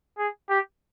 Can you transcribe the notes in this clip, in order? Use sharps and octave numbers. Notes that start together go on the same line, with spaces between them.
G#4
G4